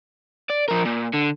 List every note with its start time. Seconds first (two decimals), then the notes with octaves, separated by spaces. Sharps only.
0.50 D5
0.68 F3 A#4
0.86 A#2
1.14 D3